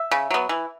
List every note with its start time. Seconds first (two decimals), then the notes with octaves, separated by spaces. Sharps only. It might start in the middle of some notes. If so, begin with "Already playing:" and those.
Already playing: E5
0.11 C#3
0.30 F#3 B3
0.49 E3